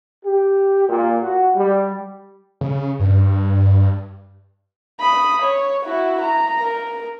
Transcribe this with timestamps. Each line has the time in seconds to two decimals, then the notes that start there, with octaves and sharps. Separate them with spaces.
0.24 G4
0.88 A#2
1.20 F#4
1.55 G3
2.61 C#3
3.00 G2
5.00 B5 D#6
5.43 C#5
5.84 E4 F#4
6.21 A#5
6.60 A#4